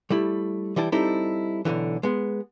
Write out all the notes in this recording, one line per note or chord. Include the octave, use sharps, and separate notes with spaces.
G3 A3 E4
E3 G3 E4 A5
G3 C4 D#4 E4 A4
B1 G2 D3 E3
G#3 B3